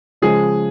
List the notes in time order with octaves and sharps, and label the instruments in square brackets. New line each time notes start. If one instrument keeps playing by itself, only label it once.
[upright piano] C#3 F3 G#3 [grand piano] G#4